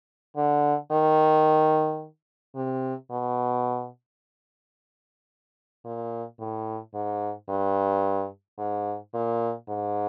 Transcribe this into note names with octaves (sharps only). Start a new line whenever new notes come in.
D3
D#3
C3
B2
A#2
A2
G#2
G2
G#2
A#2
G#2